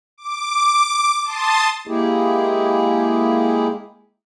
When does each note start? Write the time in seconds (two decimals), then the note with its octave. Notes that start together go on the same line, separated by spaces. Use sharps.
0.18 D6
1.24 A5 C6 D#6 A6
1.87 G#3 A#3 E4 G4 G#4